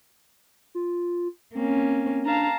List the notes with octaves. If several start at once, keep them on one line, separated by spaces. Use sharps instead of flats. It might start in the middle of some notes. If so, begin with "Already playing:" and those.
F4
A#3 C4 C#4
D4 F5 A5 A#5